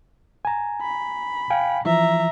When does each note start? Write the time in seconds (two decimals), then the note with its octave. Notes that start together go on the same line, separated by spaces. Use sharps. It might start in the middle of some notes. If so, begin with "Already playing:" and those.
0.45 G#5 A#5
0.82 B5
1.50 F5 G5 G#5
1.86 E3 F3 E5 A#5